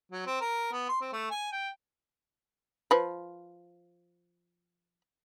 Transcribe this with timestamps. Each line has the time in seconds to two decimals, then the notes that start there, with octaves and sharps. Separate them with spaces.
0.12 F#3
0.26 C4
0.40 A#4
0.72 B3
0.89 C6
1.01 C4
1.12 A3
1.30 G#5
1.52 G5
2.91 F3 B4